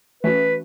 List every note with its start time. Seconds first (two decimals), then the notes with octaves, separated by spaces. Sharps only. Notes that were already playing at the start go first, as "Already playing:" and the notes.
0.23 E3 A3 C#4 F#4 B4